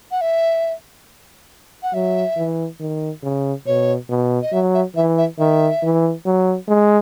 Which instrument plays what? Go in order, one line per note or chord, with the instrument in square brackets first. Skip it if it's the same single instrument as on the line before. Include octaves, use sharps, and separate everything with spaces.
[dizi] F#5
E5
F#5
[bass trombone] F#3 [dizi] E5
[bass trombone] E3
D#3
C#3
[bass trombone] B2 [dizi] C#5
[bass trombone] B2
[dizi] D#5
[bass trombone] F#3 [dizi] E5
[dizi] E5
[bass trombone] E3 [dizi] E5
[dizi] E5
[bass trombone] D#3 [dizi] E5
[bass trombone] E3
F#3
G#3